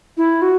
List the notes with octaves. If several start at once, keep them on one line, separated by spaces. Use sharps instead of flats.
E4
F#4